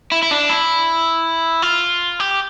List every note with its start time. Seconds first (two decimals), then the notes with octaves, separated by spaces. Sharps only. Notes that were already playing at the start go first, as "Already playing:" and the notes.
0.12 E4
0.23 E4
0.31 D4
0.50 E4
1.63 F4
2.20 G4